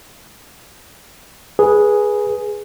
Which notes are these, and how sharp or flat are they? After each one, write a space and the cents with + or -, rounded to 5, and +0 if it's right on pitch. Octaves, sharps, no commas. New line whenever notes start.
G#4 +0 B4 -15